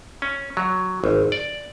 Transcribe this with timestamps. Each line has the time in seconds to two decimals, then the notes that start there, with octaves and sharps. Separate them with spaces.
0.22 C#4
0.57 F#3
1.04 G#1
1.32 D5